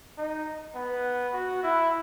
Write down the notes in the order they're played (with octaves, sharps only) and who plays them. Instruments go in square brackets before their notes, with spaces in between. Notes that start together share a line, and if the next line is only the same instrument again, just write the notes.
[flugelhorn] D#4
B3
F#4
E4